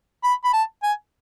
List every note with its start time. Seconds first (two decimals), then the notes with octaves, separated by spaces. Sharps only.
0.24 B5
0.44 B5
0.53 A5
0.83 G#5